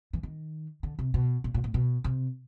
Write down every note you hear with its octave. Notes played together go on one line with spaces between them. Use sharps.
E3
D#3
D3
C3
B2
A#2
A#2
A2
B2
C3